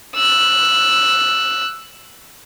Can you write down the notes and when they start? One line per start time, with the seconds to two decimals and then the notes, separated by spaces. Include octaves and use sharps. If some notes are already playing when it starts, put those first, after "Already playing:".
0.16 E6 F#6